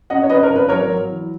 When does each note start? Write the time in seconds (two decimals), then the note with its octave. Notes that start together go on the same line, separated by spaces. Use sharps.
0.10 F#2 D#5 F#5
0.23 C#5
0.30 F#2 B4 D#5
0.43 A#4 C#5
0.50 G#1
0.56 B4
0.68 F#3 A#4 C#5
0.88 F#3
1.09 E3